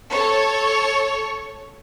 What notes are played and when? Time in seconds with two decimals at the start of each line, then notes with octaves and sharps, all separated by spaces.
0.11 A4 C#5